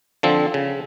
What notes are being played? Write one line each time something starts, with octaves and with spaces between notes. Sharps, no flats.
D3 F3 C4
C#3